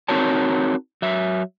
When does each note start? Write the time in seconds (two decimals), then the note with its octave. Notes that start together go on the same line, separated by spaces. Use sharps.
0.08 C4 D#4 F#4 A#4 C#5 A5
1.02 F#3 E5